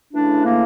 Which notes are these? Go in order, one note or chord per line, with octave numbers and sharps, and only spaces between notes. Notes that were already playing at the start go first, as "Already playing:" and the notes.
C#3 E3 A3 D4 E4
A#3